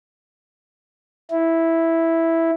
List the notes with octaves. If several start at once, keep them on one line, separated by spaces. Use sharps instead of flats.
E4